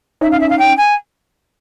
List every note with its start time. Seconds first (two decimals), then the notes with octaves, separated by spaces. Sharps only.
0.21 C#4 D#4 E5
0.31 F5
0.40 E5
0.49 F5
0.58 G5
0.77 G#5